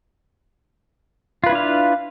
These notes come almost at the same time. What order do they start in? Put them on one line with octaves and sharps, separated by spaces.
F4 B4 E4 D4 F5